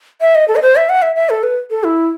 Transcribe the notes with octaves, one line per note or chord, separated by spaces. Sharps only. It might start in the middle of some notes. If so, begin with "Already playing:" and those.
E5
D#5
A4
D#5
C5
E5
F#5
E5
E5
A4
B4
A4
E4